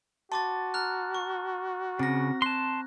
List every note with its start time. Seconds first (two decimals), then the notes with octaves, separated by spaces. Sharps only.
0.32 F#4 A5 C6 D6 A6
0.74 A#5 F6 F#6
1.14 C#6
1.99 C#3 C4 A#6
2.42 A5 C6 F#6